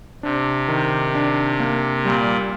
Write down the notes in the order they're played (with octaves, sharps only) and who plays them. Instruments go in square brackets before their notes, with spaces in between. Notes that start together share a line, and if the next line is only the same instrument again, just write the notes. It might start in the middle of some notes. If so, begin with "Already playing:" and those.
[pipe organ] C3 [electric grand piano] D4
[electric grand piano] D#3
D4
A#3
[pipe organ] A#2 [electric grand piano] G3